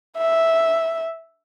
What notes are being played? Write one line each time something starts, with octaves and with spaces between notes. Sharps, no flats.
E5